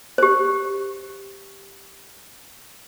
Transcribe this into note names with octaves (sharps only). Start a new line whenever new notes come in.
G4 C5